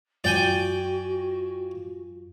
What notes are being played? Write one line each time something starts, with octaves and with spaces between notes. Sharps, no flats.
F#2 F4 F#4 D5 G5 G#5